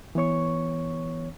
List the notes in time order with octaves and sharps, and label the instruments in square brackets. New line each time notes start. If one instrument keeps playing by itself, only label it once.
[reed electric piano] E3 B3 C#5 C#6